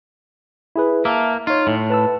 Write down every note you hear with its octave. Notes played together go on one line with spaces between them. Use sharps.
E4 G#4 B4
A#3 E5 A5
D#4 F4 C#5
A2
B4 A5 E6